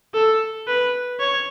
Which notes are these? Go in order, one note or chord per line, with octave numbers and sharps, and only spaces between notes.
A4
B4
C#5